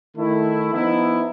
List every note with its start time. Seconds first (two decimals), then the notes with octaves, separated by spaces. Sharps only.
0.17 D#3 A3 E4
0.73 F3 B3 D#4 E4